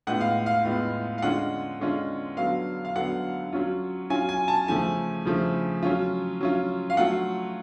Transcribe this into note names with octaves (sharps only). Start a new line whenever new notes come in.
A2 G#3 B3 F4 F#5
F5
F5
A2 G#3 B3 F4
F5
D3 G#3 C#4 F4 F#5
D3 G#3 C#4 F4
D3 F#3 B3 F5
F5
D3 F#3 B3 F#5
F#3 C#4 F4
F#3 C#4 F4 G#5
G#5
A5
C#3 F3 A3 G#5
C#3 F3 A3
F#3 C#4 F4
F#3 C#4 F4
F5
F#3 A3 F4 F#5